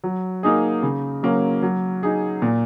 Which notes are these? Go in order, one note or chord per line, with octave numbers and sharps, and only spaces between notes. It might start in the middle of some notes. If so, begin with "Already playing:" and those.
F#3
A#3 D#4 G#4
C#3
F#3 A#3 C#4
F#3
D#4 G#4
A#2